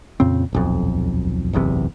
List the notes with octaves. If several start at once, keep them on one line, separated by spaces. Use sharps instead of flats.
F2 A#2 C#3 C4
D#1 B1 F2
F#1 B1 E2 C3